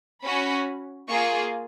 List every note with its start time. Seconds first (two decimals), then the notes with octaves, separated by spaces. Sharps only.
0.23 C#4 F#4 B5
1.08 A#3 F4 G#4 C#6